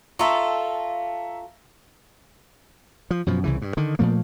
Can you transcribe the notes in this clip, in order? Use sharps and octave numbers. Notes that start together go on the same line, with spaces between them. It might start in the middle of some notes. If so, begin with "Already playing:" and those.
F4 A4 E5 A#5 C#6
F3
F#2 B2 F3
C2 C#3 E3
G2
D3 D#3
A#2 F3 A3 A#3